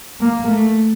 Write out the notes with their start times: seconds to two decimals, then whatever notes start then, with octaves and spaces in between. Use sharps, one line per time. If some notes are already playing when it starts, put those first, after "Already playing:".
0.20 A#3
0.48 A3